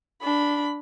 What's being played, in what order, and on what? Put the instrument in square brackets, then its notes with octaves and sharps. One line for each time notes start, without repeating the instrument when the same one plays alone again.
[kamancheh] D4 B5